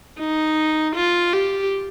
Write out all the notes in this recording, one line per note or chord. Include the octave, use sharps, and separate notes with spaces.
D#4
F4
G4